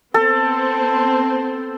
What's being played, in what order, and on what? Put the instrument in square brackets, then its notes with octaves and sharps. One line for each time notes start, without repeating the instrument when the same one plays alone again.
[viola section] B3 C4 C5 [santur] A4